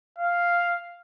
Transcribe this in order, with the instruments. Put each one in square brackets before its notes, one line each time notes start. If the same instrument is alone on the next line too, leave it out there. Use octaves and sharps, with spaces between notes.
[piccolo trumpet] F5